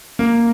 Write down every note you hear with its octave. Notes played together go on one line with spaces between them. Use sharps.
A#3